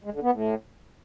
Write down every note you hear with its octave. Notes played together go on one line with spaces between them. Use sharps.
G#3
D3
B3
A2